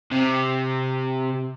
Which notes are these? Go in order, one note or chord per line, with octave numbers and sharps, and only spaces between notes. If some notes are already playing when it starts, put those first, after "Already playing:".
C3